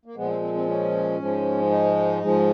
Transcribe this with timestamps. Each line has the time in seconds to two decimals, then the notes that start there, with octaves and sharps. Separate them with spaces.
0.05 A#3
0.16 A#2 F3 G#3 B3
0.28 C4
0.41 C4
0.54 C4
0.67 C#4
1.19 G#2 F3 G#3
1.70 D#4
2.22 G#2 F3 G#3